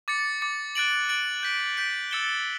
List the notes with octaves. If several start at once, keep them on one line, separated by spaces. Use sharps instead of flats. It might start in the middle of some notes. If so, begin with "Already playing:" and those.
D6 A6 C#7
D6 A6 C#7
F#6 A6 D7 F#7
F#6 A6 D7 F#7
G6 B6 D7
G6 B6 D7
E6 A6 C#7 E7 G7